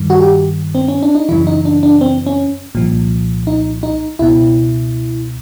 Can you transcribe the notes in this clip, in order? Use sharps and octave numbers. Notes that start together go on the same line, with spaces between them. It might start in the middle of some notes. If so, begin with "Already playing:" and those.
Already playing: G2 D#3
F#4
G4
C4
C#4
D4
D#4
F#2 C#3 E3 E4
D#4
D4
D4
C4
C#4
C2 A#2 F3
D#4
D#4
C#2 B2 E4